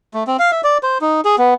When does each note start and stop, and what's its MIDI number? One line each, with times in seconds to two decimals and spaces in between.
0.14 0.24 57
0.27 0.37 60
0.39 0.51 77
0.52 0.61 76
0.64 0.78 74
0.83 0.98 72
1.01 1.21 63
1.25 1.36 68
1.38 1.54 59